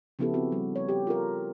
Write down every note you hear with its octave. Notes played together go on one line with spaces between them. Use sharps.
C#3 F3 B3 E4 G4 A4
C4 F#4
G3
C#5
G4
F4 A4 A#4